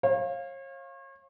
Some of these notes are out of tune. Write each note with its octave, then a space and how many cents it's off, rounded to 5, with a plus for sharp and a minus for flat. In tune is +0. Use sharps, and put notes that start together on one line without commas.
C#5 -40 F5 +0